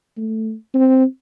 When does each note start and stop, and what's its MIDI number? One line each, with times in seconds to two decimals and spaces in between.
0.17 0.54 57
0.74 1.05 60